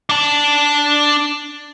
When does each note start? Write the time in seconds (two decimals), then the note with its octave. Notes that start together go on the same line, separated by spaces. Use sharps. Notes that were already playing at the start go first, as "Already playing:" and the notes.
0.09 D4 A5